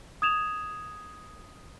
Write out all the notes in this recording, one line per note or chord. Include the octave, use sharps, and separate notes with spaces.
D#6 G#6 E7 F7